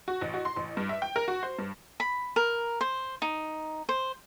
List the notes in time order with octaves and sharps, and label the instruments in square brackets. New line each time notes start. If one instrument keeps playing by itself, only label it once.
[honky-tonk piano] F#4
A1
F#4
C6
A1
G2
E5
G5
A#4
F#4
C5
G2
[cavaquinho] B5
A#4
C5
D#4
C5